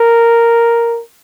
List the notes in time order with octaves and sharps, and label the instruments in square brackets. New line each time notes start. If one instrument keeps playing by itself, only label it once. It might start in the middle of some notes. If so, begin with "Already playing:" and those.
Already playing: [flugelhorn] A#4